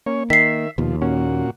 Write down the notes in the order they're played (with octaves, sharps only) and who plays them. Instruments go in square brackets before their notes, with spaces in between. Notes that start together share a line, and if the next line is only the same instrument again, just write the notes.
[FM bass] A#3 [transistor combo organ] C#4 C#5
[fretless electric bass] D#3 [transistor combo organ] E5 [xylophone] B6 C7
[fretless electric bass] D#2 [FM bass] B2 [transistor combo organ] F3
[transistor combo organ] A#2 F#4 [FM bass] C#4